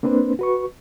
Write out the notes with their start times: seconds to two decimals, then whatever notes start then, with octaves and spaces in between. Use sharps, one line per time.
0.03 A#3 C4 D4 B4 C5
0.39 F#4 B4 C#6